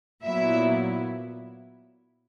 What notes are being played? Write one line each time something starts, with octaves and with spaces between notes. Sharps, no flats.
A#2 F#3 B3 E4 E5